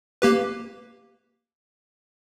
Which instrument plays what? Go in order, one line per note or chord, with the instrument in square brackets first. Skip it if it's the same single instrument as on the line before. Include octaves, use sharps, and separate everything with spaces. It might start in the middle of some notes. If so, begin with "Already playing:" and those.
[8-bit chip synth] A#3 G4 B4